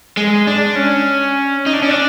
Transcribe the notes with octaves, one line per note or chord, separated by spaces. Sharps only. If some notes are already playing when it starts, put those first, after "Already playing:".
G#3
D4
C#4
D#4
D4
C#4
D4